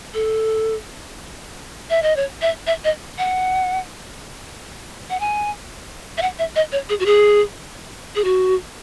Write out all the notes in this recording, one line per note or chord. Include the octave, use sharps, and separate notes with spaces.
A4
E5
D#5
C#5
E5
E5
D#5
F#5
F#5
G#5
E5
F#5
E5
D#5
C#5
G#4
F#4
G#4
G#4
F#4